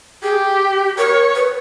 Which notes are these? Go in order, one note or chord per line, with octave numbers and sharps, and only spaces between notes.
G4 G#4
A#4 C#5
B4